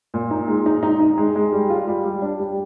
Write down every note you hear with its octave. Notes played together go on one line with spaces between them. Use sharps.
A#2
D#4
G#3
D#4
D#4
D#4
G#3
G#3
G3
F4
G3
G3
D4
G3